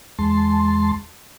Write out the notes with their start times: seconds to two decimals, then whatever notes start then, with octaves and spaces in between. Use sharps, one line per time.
0.19 E2 G#3 A5 C6